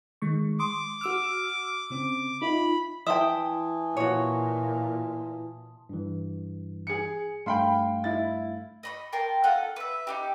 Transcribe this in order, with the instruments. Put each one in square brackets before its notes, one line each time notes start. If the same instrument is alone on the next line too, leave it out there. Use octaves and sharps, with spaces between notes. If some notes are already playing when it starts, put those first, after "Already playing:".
[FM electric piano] D#3 G#3 C#6
[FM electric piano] C6 D#6 [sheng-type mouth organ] D6
[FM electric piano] F#4 E6 F6
C#3 C4
[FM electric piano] D#4 F4 E5 [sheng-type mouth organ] B5
[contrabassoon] E3 [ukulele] E5 G5 [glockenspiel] A5 C6 D#6
[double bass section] A#2 [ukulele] F#4 C#5
[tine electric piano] G2 E3
[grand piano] G#4 C#7
[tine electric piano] G2 A3 F5 [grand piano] G5 B5 C6
[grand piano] E4 A6
[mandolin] D#5 B5 C#6
A#4 G5 A5 C6
F4 A4 F#5
B4 E5
D#4 F#4 G4